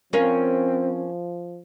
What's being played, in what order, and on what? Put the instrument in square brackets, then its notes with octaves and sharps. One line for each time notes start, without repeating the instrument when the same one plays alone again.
[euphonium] F3 [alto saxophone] C4 [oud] C#4 A#4 F5